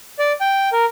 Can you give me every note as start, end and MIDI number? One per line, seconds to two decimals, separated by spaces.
0.19 0.32 74
0.41 0.69 79
0.72 0.85 70